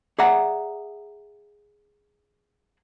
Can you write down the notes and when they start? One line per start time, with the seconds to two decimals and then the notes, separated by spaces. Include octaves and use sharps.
0.19 G#4 D5 E5 F#5 A#5